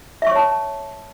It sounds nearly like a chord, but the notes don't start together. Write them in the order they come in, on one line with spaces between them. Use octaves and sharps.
E5 C#6 C#5 A5